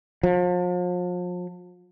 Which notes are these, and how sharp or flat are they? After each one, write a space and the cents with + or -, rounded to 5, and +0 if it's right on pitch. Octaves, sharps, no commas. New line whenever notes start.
F3 +40